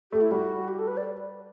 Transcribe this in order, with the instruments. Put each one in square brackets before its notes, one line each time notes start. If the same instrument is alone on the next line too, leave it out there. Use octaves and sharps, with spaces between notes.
[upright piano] A3 [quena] G4
[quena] E4
[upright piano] G3 [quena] F#4
[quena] G4
A4
B4
D5